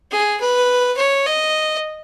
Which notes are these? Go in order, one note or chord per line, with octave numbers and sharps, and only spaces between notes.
G#4
B4
C#5
D#5